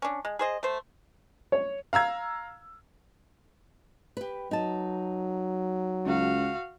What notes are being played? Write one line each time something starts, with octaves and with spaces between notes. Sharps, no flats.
C#4 D4
G#3
G#4 C5 D#5
A3 C5
C#5
F5 A#5 E6 G#6
G4 B4
F#3 D#4 A5
C#2 F#4 F5